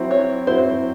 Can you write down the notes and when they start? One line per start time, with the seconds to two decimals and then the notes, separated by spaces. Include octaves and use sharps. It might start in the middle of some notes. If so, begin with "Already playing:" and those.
Already playing: F#3 C4 E4
0.11 C#5
0.47 F#3 C4 E4 C5